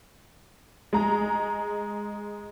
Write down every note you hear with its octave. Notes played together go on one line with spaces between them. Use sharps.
G#3 A#5